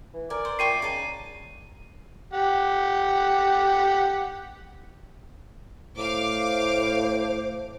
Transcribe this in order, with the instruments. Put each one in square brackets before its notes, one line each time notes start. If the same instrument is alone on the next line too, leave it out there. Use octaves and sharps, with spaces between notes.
[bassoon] E3
[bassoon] A#4 [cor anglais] D5 [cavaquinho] G#5
[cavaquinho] C5
[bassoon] A#2 [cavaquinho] E4 G5 C#6 [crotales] C7 D#7
[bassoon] C#3 [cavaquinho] D#4 G#5 A5 [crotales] C7
[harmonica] G4 F#5
[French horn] A2 [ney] C5 [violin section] F5 D6